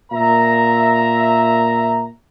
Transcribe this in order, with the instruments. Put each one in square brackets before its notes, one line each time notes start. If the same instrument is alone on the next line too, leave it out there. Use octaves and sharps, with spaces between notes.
[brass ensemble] A#2 E5 A#5